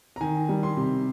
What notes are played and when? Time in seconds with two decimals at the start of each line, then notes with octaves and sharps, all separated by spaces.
0.16 A#5
0.21 D#3 G#5
0.49 G3
0.63 C6
0.77 C3